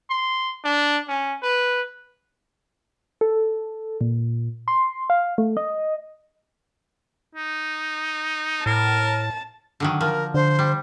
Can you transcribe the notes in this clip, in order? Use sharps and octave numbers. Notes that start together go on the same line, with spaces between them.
C6
D4
C#4
B4
A4
A#2
C6
F5
A3
D#5
D#4
A2 A#4 A5
D3 D#3 F#3
F3 A#4
D3 C5
G3